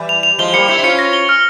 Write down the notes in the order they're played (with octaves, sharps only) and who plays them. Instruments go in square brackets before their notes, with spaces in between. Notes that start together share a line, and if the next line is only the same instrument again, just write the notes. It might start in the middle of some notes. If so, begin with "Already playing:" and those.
Already playing: [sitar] E3 G3
[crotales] F7
F7
[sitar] F3 G#3 [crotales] G7
[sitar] G3 A#3 [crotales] C#7
[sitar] C4 E4 [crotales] C#7
[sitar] E4
[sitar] C#4 F4 [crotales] C#7
[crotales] A#6
G7
F6